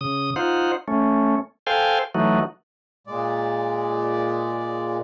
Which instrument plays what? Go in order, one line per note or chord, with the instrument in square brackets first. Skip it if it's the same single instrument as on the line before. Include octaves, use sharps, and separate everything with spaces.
[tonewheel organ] C#3 D#6
D#4 F4 C5 F#5
A3 C#4
A4 C5 F5 G5 G#5
E3 F#3 A3 D#4 F#4
[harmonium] A#2 G#3 D5